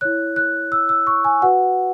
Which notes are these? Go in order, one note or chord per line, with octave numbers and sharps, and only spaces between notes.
E4 C#5 F#6
F#6
E6
E6
C#6
G#5
F#4 B4 F#5